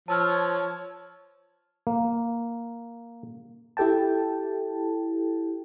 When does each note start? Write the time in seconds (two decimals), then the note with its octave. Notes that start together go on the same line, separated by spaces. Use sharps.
0.08 F3 C#5 A5 E6 F6
1.87 A#3
3.77 E4 G4 A4 G5 A5